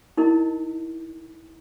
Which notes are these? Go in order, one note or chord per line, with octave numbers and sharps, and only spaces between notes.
D#4 E4 A#4 D#5